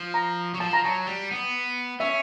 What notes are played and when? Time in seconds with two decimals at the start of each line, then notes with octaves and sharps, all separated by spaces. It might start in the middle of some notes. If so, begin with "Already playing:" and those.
Already playing: F3
0.14 A#5
0.54 F#3
0.60 F3 A5
0.73 A#5
0.84 F#3 A5
1.07 G3
1.31 B3
2.00 C#4 E5